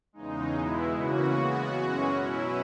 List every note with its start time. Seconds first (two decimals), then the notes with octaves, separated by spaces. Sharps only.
0.13 E2 C#3 G#3 D#4
0.52 E2 B2 G#3 B3 E4
0.91 C#3 E3 A#3 C#4 F#4
1.31 C#3 G#3 B3
1.70 F#2 E3 G#3 C#4
2.09 B2 F#3 C#4 E4